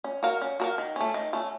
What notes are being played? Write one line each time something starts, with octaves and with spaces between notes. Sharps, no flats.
C#4
F#4 A#4 F5
C#4
F#4 A#4 F5
D#3
A3 C#4
D#3
A3 C#4